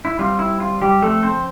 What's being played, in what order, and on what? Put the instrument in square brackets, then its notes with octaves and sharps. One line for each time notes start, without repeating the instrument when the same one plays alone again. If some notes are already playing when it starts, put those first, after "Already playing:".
[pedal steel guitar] E4
G3 C4 F4
E4
F4
G3 G4
F3 A3 C4 A4
C4 C5